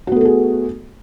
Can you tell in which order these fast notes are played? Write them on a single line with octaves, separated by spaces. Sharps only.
F#4 B3 A3 A4 G#4